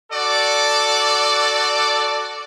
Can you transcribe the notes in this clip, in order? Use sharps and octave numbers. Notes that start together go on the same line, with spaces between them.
F#4 A4 D5